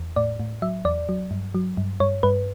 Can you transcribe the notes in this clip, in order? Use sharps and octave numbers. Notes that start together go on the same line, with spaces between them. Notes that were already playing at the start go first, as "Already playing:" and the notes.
Already playing: E2
A2 D5
A2
F#3 E5
E2 D5
F#3
G2
F#3
G2
G2 C#5
G2 B4